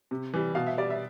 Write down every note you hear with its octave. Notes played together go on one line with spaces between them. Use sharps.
C3
E3 G3
B2 F5
E5
G3 D5
E5